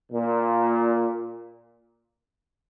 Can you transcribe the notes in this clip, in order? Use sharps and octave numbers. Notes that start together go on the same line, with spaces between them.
A#2